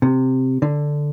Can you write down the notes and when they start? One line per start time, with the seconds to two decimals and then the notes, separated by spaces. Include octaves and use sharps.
0.02 C3
0.62 D3